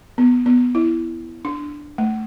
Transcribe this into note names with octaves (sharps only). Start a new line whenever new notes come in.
B3
B3
E4
D4
A3